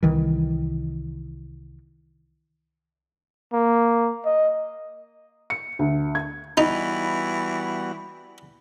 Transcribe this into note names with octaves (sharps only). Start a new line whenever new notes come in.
C2 D#3 E3
A#3
D#5
C#7
D2
G#6
E3 G3 B3 D#4 F#4 B5